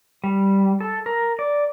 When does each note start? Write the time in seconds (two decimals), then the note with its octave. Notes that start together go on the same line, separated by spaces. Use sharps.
0.24 G3
0.80 A4
1.06 A#4
1.39 D5